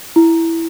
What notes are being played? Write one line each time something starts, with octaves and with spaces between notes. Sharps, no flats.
E4